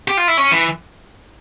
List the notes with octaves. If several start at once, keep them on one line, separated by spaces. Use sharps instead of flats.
G4
F4
E4
C#4
E3